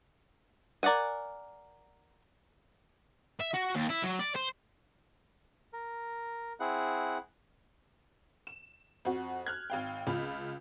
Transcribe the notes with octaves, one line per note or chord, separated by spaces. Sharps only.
A#4 D5 F5 F#5 G#5
E5
F#4
D#2
E4
F#3
D5
C5
A#4
C4 E4 G#4 F#5
E7
F2 F#4
F6 F#6 G#6
G#1 F5 G5
C#2 F4 B5